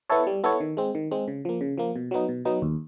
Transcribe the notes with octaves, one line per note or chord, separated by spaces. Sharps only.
B3 E4 A4 C#5
G3
B3 E4 A4 C#5
D#3
G#3 C4
D#3
G#3 C4
C#3
F3 A#3
C#3
F3 A#3
B2
F#3 B3 D#4
B2
F#3 B3 D#4
D#2